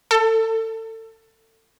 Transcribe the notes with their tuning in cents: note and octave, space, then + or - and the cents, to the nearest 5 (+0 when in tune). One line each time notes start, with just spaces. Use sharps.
A4 +30